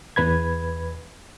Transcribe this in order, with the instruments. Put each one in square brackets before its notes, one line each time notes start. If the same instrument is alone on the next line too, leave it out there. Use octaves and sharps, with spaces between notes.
[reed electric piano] E2 B4 B5 G#6